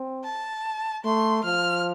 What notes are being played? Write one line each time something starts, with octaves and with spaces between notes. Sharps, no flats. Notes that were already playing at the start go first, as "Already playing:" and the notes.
Already playing: C4
A5
A3 C6
F3 F6